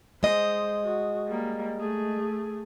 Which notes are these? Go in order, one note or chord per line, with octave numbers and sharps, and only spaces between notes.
G#3 C5 D#5
F#4
G3 A#3
A3 G#4